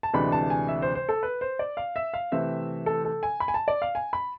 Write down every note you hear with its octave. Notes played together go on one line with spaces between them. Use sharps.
A5
D2 C3 E3 G#3 D4 B5
A5
G#5
E5
C5
C5
A4
B4
C5
D5
F5
E5
F5
C3 E3 A3 C4 E5
A4
A4
G#5
B5
G#5
A5
D5
F5
G#5
B5